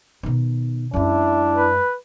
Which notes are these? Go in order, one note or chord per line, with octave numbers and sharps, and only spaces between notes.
B2 D#3
F#2 G#3 D4 E4
B4